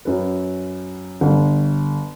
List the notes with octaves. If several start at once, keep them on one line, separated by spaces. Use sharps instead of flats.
F#2 B4
G1